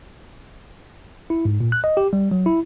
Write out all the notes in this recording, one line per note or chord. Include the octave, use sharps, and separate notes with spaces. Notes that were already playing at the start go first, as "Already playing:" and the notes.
E4
G#2
A#2
F#6
D#5
G4
G3
F#3
E4